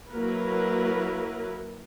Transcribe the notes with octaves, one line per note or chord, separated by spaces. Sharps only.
F#3 A#3 E4 A#4 B4